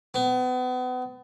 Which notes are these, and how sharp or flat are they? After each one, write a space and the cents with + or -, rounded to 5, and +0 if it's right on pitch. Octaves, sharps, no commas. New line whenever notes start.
B3 +35